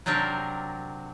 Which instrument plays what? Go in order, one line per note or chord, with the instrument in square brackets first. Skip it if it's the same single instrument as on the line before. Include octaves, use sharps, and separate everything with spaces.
[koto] C3 F#3 C4 D4 A#4